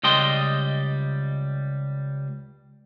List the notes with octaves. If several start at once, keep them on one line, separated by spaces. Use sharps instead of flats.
C#2 G3 D#5 G5 C6